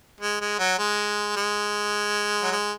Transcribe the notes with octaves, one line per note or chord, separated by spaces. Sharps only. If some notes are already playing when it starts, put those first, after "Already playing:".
G#3
G#3
F#3
G#3
G#3
F#3
G#3